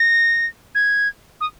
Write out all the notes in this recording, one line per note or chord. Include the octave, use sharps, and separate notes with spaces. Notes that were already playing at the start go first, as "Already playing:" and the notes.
Already playing: A#6
G#6
D#6